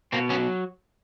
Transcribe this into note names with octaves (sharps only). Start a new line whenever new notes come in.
B2 A#3 C4
F#3 B3 C#4